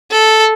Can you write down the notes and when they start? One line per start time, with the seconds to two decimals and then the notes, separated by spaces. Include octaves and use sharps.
0.11 A4